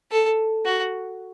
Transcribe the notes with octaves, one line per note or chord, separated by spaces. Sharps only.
A4
F#4